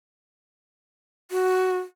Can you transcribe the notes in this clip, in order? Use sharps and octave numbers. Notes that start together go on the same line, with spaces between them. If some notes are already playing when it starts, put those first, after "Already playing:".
F#4